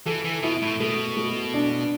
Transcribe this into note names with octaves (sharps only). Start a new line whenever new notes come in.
E3 A4
E3
B2 E4
A2
B2 A3
A3
D4